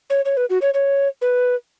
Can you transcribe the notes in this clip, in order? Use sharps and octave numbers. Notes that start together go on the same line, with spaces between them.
C#5
C#5
B4
F#4
C#5
C#5
B4